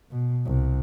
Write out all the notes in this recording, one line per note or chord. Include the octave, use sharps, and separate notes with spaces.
B2
C2